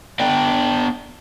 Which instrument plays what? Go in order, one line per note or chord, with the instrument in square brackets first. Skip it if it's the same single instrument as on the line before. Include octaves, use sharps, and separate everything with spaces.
[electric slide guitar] B3 D4 D5 G5